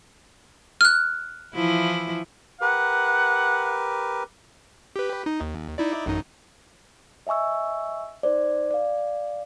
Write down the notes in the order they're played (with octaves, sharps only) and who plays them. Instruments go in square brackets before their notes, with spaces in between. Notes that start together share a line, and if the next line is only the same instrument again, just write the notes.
[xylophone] F6 F#6
[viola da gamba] E3 F3 E4
[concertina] G4 A#4 B4 [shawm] F#5
[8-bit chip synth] G4 B4
D#4
D#2
D#4 E4 D5
A1 F#2 D#4
[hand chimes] D#5 E5 G#5 C#6 E6
D#4 C5 D5
D5 F5